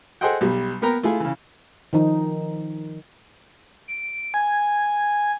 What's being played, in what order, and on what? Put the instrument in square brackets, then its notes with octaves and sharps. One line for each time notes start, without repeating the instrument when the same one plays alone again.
[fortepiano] G#4 A4 C5 D#5 F#5 G5
B1 G3
A#3 B3 A#4 G5 A#5
A3 E4 F4 G#4
C#3 E3
[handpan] D#3 F3 D#4
[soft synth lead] D7
G#5